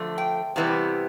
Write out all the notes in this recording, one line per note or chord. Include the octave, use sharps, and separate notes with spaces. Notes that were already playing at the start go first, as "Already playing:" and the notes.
Already playing: D3 F3 A3
G5
C3 E3 G3 B3 E4